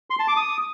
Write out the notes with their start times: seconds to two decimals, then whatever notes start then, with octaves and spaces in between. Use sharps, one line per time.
0.10 C6
0.19 A5
0.28 D6
0.37 D#6